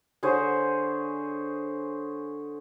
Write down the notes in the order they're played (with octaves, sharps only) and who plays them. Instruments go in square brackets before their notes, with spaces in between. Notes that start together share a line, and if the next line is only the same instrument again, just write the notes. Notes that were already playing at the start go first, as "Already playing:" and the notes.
[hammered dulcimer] D3 G#4 C5 C#5